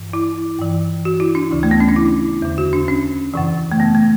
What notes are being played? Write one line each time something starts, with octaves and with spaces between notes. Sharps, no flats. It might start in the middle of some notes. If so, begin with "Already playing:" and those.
Already playing: G2 E3
E4
G2 E3
F#4
E4
D4
D2 C#3 E3
A3
B3
C#4
D4
E4
E2 D3
F#4
D4
C#4
F#2 C#3 E3
A3
B3
A3